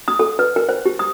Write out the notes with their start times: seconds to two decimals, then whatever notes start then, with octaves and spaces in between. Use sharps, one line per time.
0.08 D#6
0.19 A4
0.39 B4
0.56 A#4
0.69 C5
0.86 G4
0.99 D#6